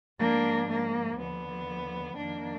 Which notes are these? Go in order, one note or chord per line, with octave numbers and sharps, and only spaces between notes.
G#2 F3 A#3 D4
A#3
D#2 D3 F3 B3
F2 D#3 A#3 D4